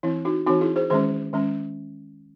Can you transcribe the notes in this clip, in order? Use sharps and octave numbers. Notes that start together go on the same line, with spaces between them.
E3 C4 E4
D#4 F#4
E3 C4 D#4 F#4
E4 G#4
G#4 C5
D#3 G#3 C#4 G#4 C5
D#3 G#3 C#4